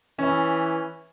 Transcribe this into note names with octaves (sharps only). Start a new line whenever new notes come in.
E3 C#4